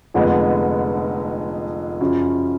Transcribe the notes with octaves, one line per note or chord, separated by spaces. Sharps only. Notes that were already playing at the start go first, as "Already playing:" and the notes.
F1 F2 D3 G#3 B3
F#2 C#3 F3